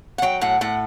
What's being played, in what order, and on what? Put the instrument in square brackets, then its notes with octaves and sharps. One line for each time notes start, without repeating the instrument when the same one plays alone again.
[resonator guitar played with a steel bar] F#5
F#3 G5
A2 F#5
A2 F#5